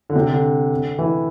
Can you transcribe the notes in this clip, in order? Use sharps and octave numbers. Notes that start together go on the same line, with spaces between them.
D3
C3
D3
E3